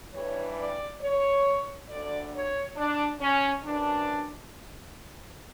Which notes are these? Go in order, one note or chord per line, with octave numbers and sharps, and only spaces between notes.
G2 E3 G3 C#5
D5
C#5
D2 D3 G3 D5
C#5
D4
C#4
F#2 E3 G3 D4